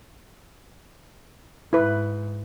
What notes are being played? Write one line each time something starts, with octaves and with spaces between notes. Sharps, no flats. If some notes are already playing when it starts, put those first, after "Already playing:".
G#2 E4 B4